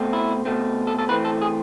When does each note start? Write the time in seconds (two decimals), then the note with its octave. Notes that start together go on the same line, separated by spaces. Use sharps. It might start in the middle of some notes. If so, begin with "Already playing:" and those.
Already playing: B2 A3 C4
0.13 E4
0.45 B2 A3 C4
0.87 A4
0.99 A4
1.09 E3 A3 C4 B4
1.25 A4
1.42 G#4